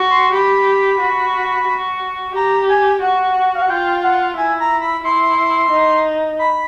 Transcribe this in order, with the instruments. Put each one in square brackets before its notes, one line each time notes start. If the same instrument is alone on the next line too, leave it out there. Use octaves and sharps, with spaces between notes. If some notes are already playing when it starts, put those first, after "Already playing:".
Already playing: [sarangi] F#4
[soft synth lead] C6
[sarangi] G4 [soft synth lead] B5
[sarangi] F#4
F#4
[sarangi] G4 [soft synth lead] A#5
[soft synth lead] G#5
[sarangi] F#4 [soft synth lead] F#5
[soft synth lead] F5
F#5
[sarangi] F4 [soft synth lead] G5
[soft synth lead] F#5
[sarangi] E4 [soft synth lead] G#5
[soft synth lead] A#5
B5
[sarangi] E4 [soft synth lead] C6
[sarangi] D#4
[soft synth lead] B5